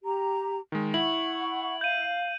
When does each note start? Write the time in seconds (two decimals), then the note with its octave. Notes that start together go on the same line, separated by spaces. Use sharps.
0.04 G4 A#5
0.72 D#3 G#3
0.94 E4 F#5 C#6 F#7
1.81 F5 G6 D#7